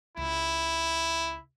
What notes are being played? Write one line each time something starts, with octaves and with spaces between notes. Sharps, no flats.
C#2 E4